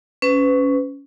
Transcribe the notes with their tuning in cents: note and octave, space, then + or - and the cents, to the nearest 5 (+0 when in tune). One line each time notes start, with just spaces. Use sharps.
C#4 +10 B4 +30